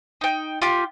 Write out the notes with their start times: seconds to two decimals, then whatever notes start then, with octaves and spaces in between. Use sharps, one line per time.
0.21 D#4 G5
0.62 F4 G4